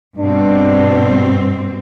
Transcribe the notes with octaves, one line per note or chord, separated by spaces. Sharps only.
G2 B2 C4 D4